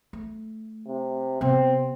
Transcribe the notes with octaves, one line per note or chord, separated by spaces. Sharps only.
A3
C3
C3 B3 C4